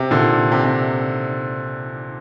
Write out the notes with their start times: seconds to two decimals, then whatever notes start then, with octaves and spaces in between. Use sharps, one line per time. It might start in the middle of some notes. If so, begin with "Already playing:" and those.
Already playing: C3
0.11 A#2 D3
0.52 C3
0.65 C3